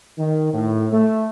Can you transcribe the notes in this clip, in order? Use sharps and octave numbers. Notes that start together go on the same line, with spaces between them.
D#3
A2
A3